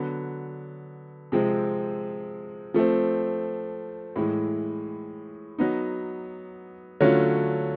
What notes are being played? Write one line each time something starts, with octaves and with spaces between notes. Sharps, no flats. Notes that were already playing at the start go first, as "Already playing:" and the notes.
Already playing: D3 F#3 B3
C3 F3 G#3 C4
F3 A3 C4
A2 E3 G#3
F#3 B3 D#4
D3 F#3 A3 C#4 F4